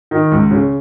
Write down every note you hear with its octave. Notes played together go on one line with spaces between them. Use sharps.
D#3
C#2
C#3